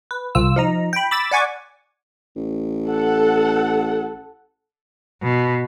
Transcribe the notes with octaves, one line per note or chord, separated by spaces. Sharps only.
B4
C2 F4 E6
F3 D#4 A#5
G5 B5
B5 D6 E6 A6
D5 F#5 G#5 C#6 D6
A1
A4 F#5
B2